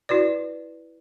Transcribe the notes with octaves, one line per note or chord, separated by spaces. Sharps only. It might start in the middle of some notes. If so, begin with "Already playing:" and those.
E4 F#4 B4 D5